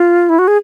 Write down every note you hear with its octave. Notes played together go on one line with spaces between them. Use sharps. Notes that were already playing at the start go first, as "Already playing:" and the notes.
Already playing: F4
E4
F#4
G#4